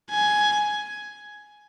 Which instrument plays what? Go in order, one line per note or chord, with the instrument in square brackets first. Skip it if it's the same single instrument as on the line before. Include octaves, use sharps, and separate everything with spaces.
[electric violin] G#5